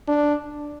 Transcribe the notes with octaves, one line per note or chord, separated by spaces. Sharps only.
D4